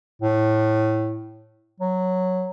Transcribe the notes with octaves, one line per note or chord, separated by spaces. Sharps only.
A2
F#3